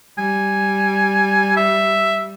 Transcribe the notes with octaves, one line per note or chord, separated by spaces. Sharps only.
G3 G#5
E5